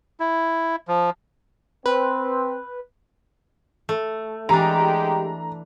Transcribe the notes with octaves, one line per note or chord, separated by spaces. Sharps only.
E4
F3
C4 B4
A3
E3 G#3 D4 G4 A#5